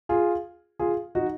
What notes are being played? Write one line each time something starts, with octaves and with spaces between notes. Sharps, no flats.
F4 G#4
F4 G#4
D#4 F#4